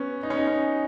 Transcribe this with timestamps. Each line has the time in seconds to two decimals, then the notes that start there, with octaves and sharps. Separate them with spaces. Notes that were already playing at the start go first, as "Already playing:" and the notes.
Already playing: B3 C#4
0.23 D#4
0.30 C#4
0.37 D#4
0.47 C#4